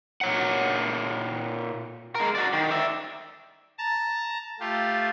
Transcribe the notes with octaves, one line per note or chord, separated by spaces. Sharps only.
A#2 C#5 F#5
G#3 A#4
F#4 D5
D#3
D5 E5
A5 A#5
A3 F4 G4